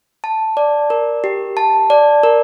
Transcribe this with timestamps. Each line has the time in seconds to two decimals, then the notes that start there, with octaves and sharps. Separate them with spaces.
0.24 A5
0.57 D5
0.90 A#4
1.24 G4
1.57 A5
1.90 D5
2.23 A#4